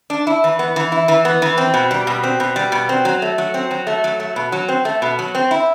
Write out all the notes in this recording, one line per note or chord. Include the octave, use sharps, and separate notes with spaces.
D4
E4
E3
B3
E3
E4
E3
B3
E3
C4
B2
G3
B2
C4
B2
G3
B2
C4
F#3
A3
F#3
C4
F#3
A3
F#3
A3
B2
F#3
C4
A3
B2
F#3
C4
E4